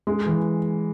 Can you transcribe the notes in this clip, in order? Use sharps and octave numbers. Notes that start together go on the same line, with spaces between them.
G#3
E3